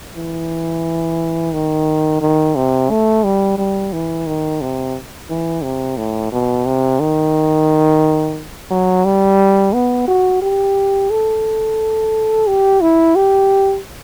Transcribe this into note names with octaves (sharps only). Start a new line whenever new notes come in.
E3
D#3
D#3
C3
A3
G3
G3
E3
D#3
C3
E3
C3
A2
B2
C3
D#3
F#3
G3
B3
F#4
G4
A4
G4
E4
G4